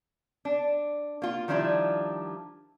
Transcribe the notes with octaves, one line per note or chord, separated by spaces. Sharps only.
D4
A#3 F4
D#3 F3 G3 D4 E4 F4